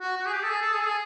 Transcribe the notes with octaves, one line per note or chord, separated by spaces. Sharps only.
F#4
F#4
G#4
G4
A4
G#4
A4
G#4
A4
G#4